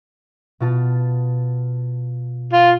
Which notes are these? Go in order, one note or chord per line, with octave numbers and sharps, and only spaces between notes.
B2 F4 A5
F4